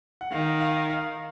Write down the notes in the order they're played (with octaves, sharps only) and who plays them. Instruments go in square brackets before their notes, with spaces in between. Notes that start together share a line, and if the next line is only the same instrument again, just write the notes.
[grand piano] F#5
[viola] D#3 [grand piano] F5
[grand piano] F5
F5